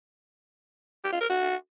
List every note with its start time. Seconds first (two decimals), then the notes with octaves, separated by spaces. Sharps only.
1.04 G4
1.13 F4
1.21 A#4
1.29 F#4